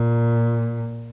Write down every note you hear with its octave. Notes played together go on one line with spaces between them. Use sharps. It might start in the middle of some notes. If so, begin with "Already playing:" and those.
Already playing: A#2